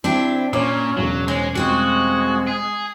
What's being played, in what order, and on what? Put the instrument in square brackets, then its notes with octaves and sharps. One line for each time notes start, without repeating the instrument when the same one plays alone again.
[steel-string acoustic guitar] C4 D4 G4 [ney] E4
[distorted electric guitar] A#2 [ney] C#4 [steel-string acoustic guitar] F4 [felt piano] C#5 D6
[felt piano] E1 C#3 [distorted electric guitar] F#3
[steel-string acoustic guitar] G#2 [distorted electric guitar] G#3 [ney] C#5
[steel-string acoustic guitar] G3 C4 F4 [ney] G#3 [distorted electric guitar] F#4
[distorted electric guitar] G#4